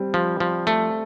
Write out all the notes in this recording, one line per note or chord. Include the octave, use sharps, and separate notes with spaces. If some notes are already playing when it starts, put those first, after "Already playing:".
Already playing: G3 C4
F3
F3
A3